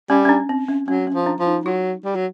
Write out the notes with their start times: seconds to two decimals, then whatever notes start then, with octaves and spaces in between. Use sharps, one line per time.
0.10 G3 C#4
0.25 C#4
0.29 D4
0.49 C4
0.69 C#4
0.88 F#3 C#4
1.07 C#4
1.14 F3
1.26 D4
1.40 F3
1.47 D#4
1.65 F#3 F4
2.05 G3
2.15 F#3